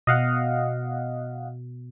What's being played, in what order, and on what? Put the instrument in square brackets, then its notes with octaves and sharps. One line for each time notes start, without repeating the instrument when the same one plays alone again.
[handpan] B2 [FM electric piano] D#5 F5 F#5